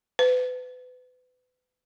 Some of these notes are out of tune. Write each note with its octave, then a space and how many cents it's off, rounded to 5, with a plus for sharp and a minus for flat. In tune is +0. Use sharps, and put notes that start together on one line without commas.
B4 +35